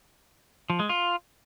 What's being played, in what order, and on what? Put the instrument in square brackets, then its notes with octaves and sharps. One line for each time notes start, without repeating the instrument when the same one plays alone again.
[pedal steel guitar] F3
G#3
F4